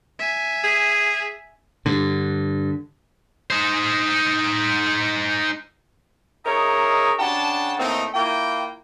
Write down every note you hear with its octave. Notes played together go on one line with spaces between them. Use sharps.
E5 G#5
G#4
G2 D3
D#4 C5
D#4 G#4 A#4 C#5 D#5 E5
C#3 D4 F#5 G5 A5
A2 A3 A#3 C4 D#4
A#3 E4 F4 G5